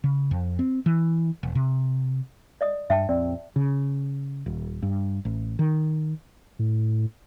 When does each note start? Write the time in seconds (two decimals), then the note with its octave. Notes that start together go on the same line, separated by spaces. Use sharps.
0.04 C#3
0.31 F2
0.59 C4
0.86 E3
1.43 E1
1.55 C3
2.61 D5 D#5 D#6
2.90 G2 E5 G5 A5
3.09 A#1 F2 C4 D5
3.56 C#3
4.46 D#1
4.82 G2
5.25 A1
5.59 D#3
6.59 A2